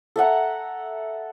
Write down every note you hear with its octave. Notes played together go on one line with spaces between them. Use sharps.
A4 E5 F#5 A#5